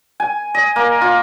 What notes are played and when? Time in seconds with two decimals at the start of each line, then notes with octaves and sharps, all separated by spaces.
0.20 G#5
0.54 D#5
0.76 A#3
1.01 F4